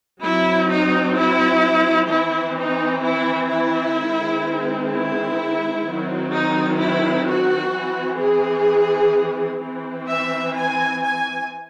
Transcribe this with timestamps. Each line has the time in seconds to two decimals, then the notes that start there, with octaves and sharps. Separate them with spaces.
0.21 F#3 C4 E4
0.68 D#4
1.15 E4
2.09 E3 C4 E4
2.56 D#4
3.03 E4
3.50 E4
3.97 D#3 G#3 C4
4.91 E4
5.85 D#3 F#3 C4
6.32 D#4
6.78 E4
7.26 F#4
7.72 E3 C4
8.19 G#4
9.60 E3 C4
10.07 E5
10.54 G#5
11.01 G#5